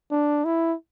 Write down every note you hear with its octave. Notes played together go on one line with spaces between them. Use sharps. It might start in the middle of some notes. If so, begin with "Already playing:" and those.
D4
E4